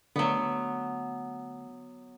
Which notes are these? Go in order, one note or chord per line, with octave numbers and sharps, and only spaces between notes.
D3 F#3 A3 B3